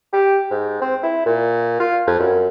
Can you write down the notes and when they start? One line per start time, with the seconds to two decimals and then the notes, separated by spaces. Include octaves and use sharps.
0.13 G4
0.51 G#2
0.81 C4
1.03 E4
1.26 A#2
1.80 F4
2.07 F2
2.19 F#2